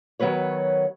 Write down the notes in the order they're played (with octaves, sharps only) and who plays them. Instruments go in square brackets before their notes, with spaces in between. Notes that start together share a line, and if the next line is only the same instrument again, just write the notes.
[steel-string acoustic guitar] D#3 F#3 B3 B4 C#5